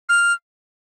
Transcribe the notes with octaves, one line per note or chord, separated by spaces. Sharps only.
F6